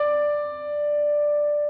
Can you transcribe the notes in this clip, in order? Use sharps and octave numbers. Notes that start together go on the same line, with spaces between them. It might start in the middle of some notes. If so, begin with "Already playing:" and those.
Already playing: D5 D6